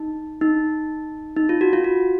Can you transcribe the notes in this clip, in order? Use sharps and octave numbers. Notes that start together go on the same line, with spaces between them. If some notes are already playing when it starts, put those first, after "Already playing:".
Already playing: D#4
D#4
D#4
F4
F#4
F4
F#4